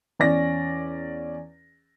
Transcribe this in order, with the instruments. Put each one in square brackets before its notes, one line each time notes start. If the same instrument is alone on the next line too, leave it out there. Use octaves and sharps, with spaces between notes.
[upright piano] E2 C#4 D5 A#6